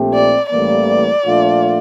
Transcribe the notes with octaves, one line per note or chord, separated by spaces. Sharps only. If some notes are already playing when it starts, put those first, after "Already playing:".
Already playing: A#1 A#2 A3 C4 G4
D5
A1 A2 E3 G3 A#3 D5
A#2 F3 A3 D4 F4